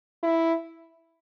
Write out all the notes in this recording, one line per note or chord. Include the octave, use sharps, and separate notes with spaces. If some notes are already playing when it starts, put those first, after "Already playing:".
E4